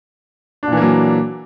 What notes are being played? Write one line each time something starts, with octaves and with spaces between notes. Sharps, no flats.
A#2 E3 F#3 A#3 D4